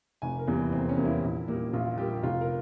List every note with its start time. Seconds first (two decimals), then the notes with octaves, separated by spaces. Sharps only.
0.22 F1 G#5
0.39 A#4
0.47 E2 E3 G3 A#3
0.72 F1 C4
0.89 C#4
0.98 E2 E3 G3 A#3
1.05 E4
1.22 A#1
1.47 A#2 G3 A#3
1.73 A#1 F4
1.97 A#2 G3 A#3 G4
2.23 F1 F4
2.41 A#4